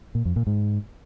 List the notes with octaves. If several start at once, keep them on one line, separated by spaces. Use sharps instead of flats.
A#2
F2
A#2
G#2